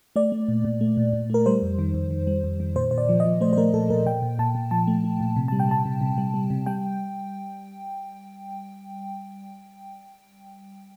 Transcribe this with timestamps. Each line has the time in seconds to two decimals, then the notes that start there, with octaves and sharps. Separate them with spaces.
0.16 A3 D5
0.32 A3
0.48 A#2
0.65 A#2
0.81 A3
0.97 A#2
1.13 A#2
1.30 A3 A#4
1.46 G3 C5
1.62 F2
1.79 D#3
1.94 F2
2.11 D#3
2.27 G3
2.44 F2
2.60 D#3
2.76 A#2 C5
2.91 A#2 C5
2.98 D5
3.09 F3
3.20 F3 D#5
3.41 A3 C5
3.53 C5
3.57 A3 A#4
3.74 A#2 A4
3.90 A#2 A#4
4.06 A#2 G5
4.22 A#2
4.39 A#2 A5
4.55 A#2
4.71 F3 A5
4.87 A3
5.04 A3
5.20 A#2
5.36 C3
5.48 G3 A5
5.60 G5
5.69 G3 A5
5.85 C3
6.01 C3
6.18 G3
6.34 G3
6.50 C3
6.66 G3 G5